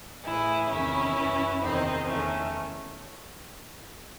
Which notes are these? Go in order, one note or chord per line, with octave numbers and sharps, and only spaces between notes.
A2 E3 E4 G#4
E2 C3 D#3 C#4 E4
F#2 E3
E2 C3 D#3 C4 D#4
E2 D#3 A3 C#4